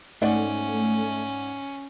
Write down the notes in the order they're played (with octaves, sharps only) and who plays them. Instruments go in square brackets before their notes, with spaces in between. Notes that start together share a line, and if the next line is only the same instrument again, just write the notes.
[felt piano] G#2 D5 F#5 [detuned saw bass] A3 [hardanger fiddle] C#4